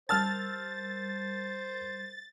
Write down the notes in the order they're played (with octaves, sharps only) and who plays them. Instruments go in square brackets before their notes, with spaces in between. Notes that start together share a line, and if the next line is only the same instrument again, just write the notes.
[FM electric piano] G3 A#4 [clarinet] C5 [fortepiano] A5 E6 F6 [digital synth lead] A6